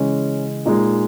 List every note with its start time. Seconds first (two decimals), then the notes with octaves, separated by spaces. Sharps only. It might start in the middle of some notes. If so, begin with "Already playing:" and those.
Already playing: C#3 E3 G#3 C#4
0.66 A#2 G#3 D#4